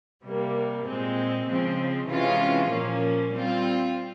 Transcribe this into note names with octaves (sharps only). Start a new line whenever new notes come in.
C3 G3 A#3
A#2 G#3 C4
C#3 F3 G#3 C4
C3 E3 G#3 C#4 F4
A#2 F3 A#3 C#4
G3 C4 F4